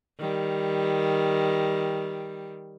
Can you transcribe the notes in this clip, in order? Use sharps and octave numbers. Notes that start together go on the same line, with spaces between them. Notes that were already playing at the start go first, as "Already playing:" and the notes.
D#3 G3